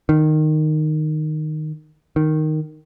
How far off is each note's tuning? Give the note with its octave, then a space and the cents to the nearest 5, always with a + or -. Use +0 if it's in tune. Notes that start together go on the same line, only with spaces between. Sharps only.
D#3 -10
D#3 -5